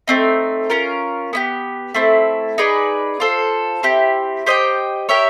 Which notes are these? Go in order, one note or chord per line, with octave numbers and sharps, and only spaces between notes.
A3 C4 D#4
C#4 F4 A#4
B3 E4 G4
A3 C4 E4
D#4 G#4 B4 D5
F4 A4 C5
C4 E4 G4
G4 C5 D#5 G5
G4 A#4 C#5 E5